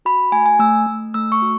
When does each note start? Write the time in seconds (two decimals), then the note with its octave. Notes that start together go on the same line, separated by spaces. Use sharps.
0.05 F#4 B5
0.32 A3 G#5
0.46 G#5
0.59 A3 E6
0.87 A3
1.14 A3 E6
1.32 C#6
1.42 F#4